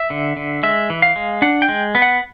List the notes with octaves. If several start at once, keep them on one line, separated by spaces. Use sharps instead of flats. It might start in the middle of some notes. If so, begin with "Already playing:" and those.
Already playing: E5
D3
D3
G#3 E5
E3
F5
G#3
D4 F#5
G5
G#3
B3
F#5